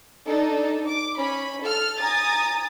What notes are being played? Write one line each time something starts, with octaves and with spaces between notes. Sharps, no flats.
D4 D#4 A4
D6
C#4 B5
A4 F6
G#5 A#5 D#6 A6